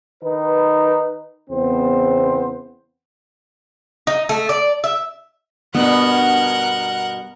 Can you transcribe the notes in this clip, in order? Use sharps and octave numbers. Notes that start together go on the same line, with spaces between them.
D#3 D#4 B4
E2 C#3 B3 C4 C5
D#4
A3
D5
E5
G2 B2 B3 A#4 F#5